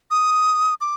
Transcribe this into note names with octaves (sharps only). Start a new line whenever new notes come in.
D#6
D6